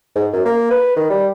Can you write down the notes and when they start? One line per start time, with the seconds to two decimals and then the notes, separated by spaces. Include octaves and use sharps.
0.16 G#2
0.33 F#2
0.45 A#3
0.70 B4
0.96 D#3
1.10 G3